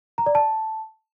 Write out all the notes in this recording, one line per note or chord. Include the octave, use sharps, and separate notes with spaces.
A#5
D5
A5